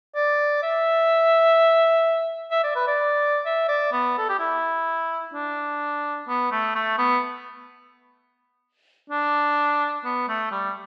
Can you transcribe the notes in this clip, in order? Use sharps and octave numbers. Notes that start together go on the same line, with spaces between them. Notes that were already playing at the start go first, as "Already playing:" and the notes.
D5
E5
E5
D5
B4
D5
E5
D5
B3
A4
G4
E4
D4
B3
A3
A3
B3
D4
B3
A3
G3